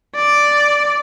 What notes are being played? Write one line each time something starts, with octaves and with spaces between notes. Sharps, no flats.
D5